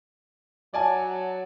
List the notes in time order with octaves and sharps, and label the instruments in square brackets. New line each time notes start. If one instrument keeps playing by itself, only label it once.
[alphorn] F#3 [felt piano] D5 G#5 A5